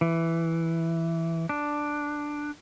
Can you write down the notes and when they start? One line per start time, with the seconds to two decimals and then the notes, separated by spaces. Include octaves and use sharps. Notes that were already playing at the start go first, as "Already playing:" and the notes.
0.01 E3
1.49 D4